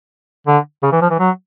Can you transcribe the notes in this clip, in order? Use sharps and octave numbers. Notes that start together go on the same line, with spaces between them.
D3
C#3
E3
F3
E3
F#3